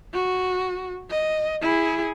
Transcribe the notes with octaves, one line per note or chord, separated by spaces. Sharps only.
F#4
D#5
E4 G#4